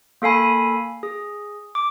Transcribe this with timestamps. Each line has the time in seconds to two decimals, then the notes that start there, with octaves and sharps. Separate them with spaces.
0.22 A#3 A4 F5 G#5 B5
1.03 G#4
1.75 D6